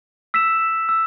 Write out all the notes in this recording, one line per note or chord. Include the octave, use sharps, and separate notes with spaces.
E6 B6 E7
E6